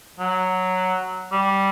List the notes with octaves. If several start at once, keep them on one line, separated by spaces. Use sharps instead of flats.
F#3
G3